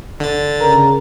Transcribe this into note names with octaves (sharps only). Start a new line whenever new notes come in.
D3 A6
C#3 A#4